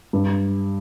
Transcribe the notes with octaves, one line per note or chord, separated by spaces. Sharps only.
G2